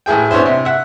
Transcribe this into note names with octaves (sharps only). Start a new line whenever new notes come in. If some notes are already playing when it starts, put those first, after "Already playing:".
A1 E4 G#4 G5
B3 C#4 D4 E4 C5
C3
E5 F#5